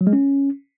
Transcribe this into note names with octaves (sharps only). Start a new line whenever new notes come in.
F#3
G#3
C#4